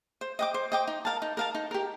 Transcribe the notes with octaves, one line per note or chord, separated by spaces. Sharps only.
C5
D#5 G5 D6
C5
D#5 G5 D6
D#4
A#4 F5 A5
D#4
A#4 F5 A5
D#4
G4 A#4